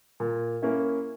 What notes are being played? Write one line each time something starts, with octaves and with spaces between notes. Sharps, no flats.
A#2
A#3 C#4 E4